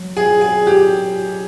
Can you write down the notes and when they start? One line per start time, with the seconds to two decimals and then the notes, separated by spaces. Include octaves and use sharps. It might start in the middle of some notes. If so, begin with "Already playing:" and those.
Already playing: F#3
0.17 G#4
0.41 G#4
0.67 G4